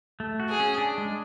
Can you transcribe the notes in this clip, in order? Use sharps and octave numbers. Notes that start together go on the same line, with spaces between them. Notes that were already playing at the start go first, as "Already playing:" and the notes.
A3
F#4
G#4
C#4
D4
G#3